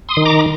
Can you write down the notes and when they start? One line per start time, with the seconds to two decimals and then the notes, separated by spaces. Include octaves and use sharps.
0.09 C6 D#6
0.17 D#3
0.25 A#5 D6